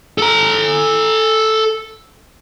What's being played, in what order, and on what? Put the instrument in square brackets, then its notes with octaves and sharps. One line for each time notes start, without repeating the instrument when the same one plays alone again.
[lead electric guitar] A4 A#5